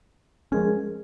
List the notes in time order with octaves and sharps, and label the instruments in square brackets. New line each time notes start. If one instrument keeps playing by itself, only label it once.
[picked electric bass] F3 G#3 C#4 [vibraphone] G#4 A#4